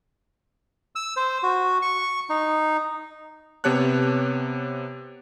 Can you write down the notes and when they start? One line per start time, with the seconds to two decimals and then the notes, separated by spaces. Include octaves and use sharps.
0.95 E6
1.16 C5
1.43 F#4
1.82 C#6
2.30 D#4
3.64 C3 B3 G4 C#5 A5 F#6